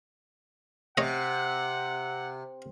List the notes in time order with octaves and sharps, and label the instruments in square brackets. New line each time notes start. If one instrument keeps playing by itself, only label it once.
[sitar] C3 [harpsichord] C#5 D#5 [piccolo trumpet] F#5